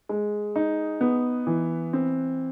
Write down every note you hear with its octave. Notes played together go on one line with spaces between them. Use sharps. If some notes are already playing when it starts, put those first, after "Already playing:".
G#3
D#4
B3
E3
C4